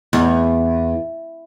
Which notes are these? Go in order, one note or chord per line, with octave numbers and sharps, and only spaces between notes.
E2